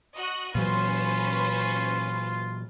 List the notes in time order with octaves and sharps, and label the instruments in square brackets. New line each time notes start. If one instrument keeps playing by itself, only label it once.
[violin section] F#4 D#5 F#6
[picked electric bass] A#2 E3 F#3 [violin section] C#4 B4 C5 [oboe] F4